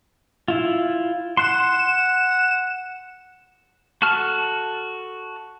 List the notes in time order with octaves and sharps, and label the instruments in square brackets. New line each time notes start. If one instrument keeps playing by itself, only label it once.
[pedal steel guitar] E4 F4
[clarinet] F#5 [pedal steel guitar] C6 F#6 [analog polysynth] E7
[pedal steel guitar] F#4 A4 A5 F6